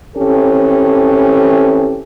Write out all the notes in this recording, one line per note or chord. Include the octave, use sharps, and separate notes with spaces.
E3 C4 C#4 G4 A4